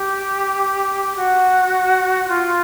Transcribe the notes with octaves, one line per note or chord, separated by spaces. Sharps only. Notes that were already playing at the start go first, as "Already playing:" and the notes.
Already playing: G4
F#4
F4